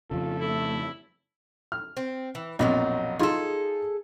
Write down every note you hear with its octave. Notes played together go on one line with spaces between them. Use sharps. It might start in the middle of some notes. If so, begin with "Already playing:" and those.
F2 C#3 F4 A4
A3 E4
F6
C4
E3
A#1 F2 B2 F3 F#3 D#4
D#4 F4 G#4 A4 C6